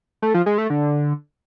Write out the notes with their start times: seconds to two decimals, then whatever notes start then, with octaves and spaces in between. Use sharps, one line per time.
0.22 A3
0.34 F3
0.46 G#3
0.58 A3
0.70 D3